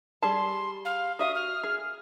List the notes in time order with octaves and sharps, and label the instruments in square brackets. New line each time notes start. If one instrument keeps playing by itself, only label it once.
[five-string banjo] G3 G#4 A5 [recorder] C6
[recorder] F5
[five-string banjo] F#4 E5 F5 [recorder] D#6
[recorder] F6
[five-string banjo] G#4